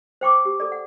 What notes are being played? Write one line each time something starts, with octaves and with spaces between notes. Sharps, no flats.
C5 G5 C#6 D6
G4
A4 D5
F#5